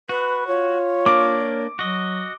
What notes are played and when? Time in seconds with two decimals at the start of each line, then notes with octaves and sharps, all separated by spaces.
0.09 F#4 B4
0.47 F4 C#5
1.06 A#3 D4 A#4 D6
1.79 F#3 F#4 D#5